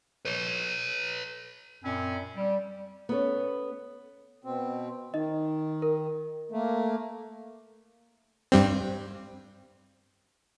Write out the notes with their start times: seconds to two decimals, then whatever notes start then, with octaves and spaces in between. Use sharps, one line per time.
0.25 B4 C#5
1.83 F#2 A#2 C4 C#4 B5
2.36 G3
3.09 B3 C#4 A4 C#5
4.44 B2 C4
5.14 D#3 D#4 D#5
5.82 A#4
6.52 A3 A#3
8.52 G2 G3 C4